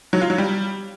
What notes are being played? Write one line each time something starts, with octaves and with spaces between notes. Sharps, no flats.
F#3
F4
F#3
G3